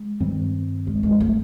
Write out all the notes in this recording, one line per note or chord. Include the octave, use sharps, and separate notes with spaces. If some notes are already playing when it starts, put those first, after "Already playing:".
Already playing: G#3
G2 D#3 G3 C4
G#3
G#3
A3